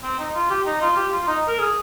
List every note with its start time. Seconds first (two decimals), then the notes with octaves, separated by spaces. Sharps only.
0.03 C4
0.19 D#4
0.35 F4
0.50 G4
0.66 D#4
0.82 F4
0.96 G4
1.12 F4
1.27 D#4
1.48 A#4
1.59 G#4